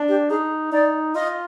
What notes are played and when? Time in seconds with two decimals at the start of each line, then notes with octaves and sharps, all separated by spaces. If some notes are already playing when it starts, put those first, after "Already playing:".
Already playing: D4
0.08 G4
0.30 D#4 G#4
0.72 D#4 D5
1.15 F4 D#5